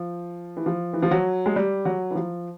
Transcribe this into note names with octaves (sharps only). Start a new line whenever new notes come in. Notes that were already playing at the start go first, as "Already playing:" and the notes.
Already playing: F3
E3
F3
E3
F3
F#3
G#3
G3
F#3
E3
F3